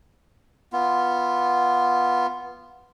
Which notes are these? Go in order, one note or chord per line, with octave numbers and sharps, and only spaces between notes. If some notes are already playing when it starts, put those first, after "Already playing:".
B3 F4